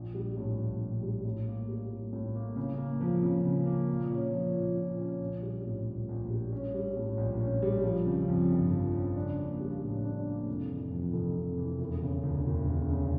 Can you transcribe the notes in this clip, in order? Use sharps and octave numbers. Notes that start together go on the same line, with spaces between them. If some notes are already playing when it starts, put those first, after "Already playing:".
Already playing: A#1
G3
A2
A#1
A#1
G3
A2
A#3
G3
A2
A2
A#3
C#3
A#3
F3
C#3
C#3
A#3
A#2
C#4
F3
A#2
A#2
C#4
A#1
G3
A2
A#1
A#1
G3
C#4
G3
A2
A#1
C#4
G3
F3
C#3
F2
G1
F3
C#3
D4
A#3
G3
A2
D4
A#3
F1
E3
F2
F1
F1
E3
E1
C#3
D2
E1
E1
C#3